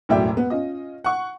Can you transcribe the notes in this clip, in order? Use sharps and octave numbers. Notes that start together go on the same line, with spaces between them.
E1 F#2 A2 D5 E5 G5
B3
C#4 F4 D#5
F#5 C#6